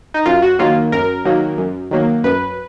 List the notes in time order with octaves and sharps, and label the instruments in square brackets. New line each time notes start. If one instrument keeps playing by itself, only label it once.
[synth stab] D#4
F#2 F4
F#4
D#3 F#3 A#3 F4
F#2 A#4
D#3 F#3 A#3
F#2
D#3 F#3 A#3
F#2 B4